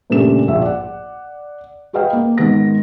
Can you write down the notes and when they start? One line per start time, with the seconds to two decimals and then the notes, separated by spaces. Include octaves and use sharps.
0.10 G2 A#2 C#3 A3 G4 E7
0.48 A#1 E5
0.62 D5 F#5
1.93 F#4 G#4 B4 D#5 F5 G5
2.13 A#3
2.38 G#2 D#3 G#3 B3 A#6